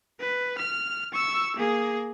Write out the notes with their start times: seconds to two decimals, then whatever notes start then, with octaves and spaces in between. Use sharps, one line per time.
0.20 B4
0.58 F6
1.12 C#6 E6
1.56 A#3 G#4